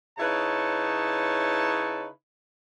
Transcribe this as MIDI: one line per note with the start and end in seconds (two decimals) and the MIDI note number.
0.18 2.07 49
0.18 2.07 63
0.18 2.07 64
0.18 2.07 71
0.18 2.07 73
0.18 2.07 81